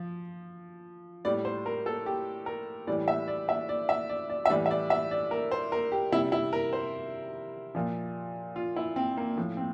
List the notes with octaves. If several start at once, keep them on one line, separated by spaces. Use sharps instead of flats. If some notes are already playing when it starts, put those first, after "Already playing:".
Already playing: F3
A2 G3 D5
C5
A#4
A4
G4
A#4
A2 E3 G3 D5
E5
D5
E5
D5
E5
D5
D5
E5
A2 E3 G3 D5
E5
D5
E5
D5
A#4
C5
A#4
G4
C3 G3 E4
E4
A#4
C5
A#2 F3
F4
E4
C4
A#3
A2 F3
C4